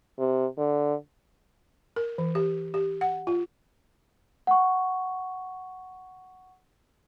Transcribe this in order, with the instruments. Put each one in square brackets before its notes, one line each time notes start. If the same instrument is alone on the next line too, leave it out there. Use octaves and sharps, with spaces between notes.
[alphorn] C3
D3
[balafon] A#4
E3
G4
G4
F#5
F4
[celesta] F#5 C#6